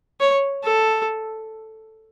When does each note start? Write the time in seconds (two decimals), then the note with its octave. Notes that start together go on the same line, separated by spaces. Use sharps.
0.20 C#5
0.64 A4